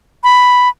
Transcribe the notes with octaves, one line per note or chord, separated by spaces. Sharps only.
B5